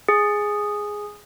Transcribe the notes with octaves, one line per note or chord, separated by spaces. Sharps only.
G#4